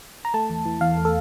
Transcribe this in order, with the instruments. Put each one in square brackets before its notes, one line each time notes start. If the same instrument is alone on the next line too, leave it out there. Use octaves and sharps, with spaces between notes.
[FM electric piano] A#5
A3 A5
E2
E3
E2 F5
A3
A4